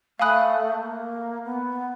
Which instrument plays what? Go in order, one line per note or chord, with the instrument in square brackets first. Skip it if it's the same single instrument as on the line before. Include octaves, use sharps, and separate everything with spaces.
[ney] A3 [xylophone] F5 G#5 B5 D#6 F#6
[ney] A#3
B3